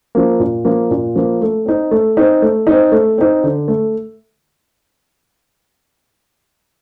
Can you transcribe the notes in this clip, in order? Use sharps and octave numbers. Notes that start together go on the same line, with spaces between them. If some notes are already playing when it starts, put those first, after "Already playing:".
F3 A#3
A#2
F3 A#3
A#2
F3 A#3
A3
C4 D#4
A3
C4 D#4
A3
C4 D#4
A3
C4 D#4
D3
A3